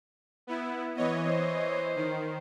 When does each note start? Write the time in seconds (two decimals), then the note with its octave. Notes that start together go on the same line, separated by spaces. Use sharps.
0.47 B3 E4
0.96 E3 B3 C#5 D#5
1.29 C5
1.96 D#3